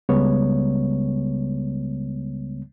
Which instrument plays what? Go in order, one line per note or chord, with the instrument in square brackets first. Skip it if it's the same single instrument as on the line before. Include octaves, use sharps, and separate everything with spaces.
[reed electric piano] C#2 C#3 G3 G#3 B3 C#5